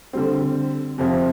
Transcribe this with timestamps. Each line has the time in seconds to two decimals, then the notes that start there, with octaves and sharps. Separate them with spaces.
0.13 D3 G3 C4
0.98 F2 C3 F3